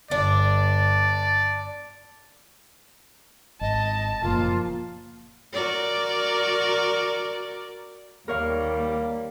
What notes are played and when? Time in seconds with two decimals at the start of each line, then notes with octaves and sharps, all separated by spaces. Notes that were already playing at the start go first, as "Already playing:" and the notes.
0.11 G1 D4 D5
3.61 G#1 D#5 A5
4.22 F#1 A#2 F3 A#3 F4
5.53 F#4 A#4 D5
8.28 D#2 G3 A#3 A#4 C#5 F5